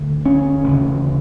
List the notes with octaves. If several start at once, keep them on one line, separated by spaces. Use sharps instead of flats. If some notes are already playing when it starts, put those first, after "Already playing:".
Already playing: D2 D3
C#4
E1 D2 C#3